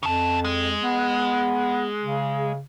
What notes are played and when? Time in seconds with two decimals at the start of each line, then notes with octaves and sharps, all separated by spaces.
0.03 F2 C#3 A5
0.45 G#3
0.82 B3
2.03 C#3